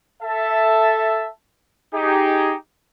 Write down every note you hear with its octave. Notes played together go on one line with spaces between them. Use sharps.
A4 E5 A5
D#4 G4 G#4